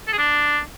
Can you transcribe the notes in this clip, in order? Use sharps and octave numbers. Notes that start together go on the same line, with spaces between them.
A4
G#4
D4